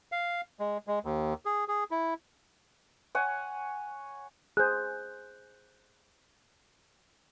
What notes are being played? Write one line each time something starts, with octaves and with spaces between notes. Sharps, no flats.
F5
G#3
G#3
D#2
G#4
G#4
E4
C#5 F#5 G#5
G#4 C5 F#6 G6